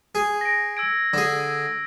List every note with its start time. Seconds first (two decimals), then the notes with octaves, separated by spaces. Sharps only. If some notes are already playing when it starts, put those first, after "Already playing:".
0.15 G#4
0.41 A#6 D7
0.77 E6 G#6 D7
1.13 D3 G#4